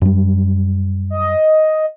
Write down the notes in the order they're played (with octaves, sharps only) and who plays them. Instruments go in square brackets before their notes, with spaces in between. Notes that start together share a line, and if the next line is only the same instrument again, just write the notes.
[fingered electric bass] F#2 G3
[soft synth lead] D#5